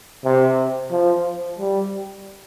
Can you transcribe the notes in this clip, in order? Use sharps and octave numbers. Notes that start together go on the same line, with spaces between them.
C3
F3
G3